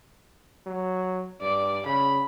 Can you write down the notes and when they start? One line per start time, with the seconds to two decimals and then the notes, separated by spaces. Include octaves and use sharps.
0.66 F#3
1.41 G2 D5
1.86 C#3 B5